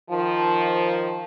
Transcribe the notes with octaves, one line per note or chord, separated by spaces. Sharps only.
D#3 F3